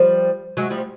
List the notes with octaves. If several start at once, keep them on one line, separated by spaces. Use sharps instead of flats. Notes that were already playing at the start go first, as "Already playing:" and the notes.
Already playing: F3 G3
F#3 G#3
F3 G3